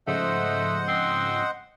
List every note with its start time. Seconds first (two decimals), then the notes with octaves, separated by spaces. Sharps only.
0.07 G#2 C#3 F3 A3 C5 D#5 F#5
0.88 C4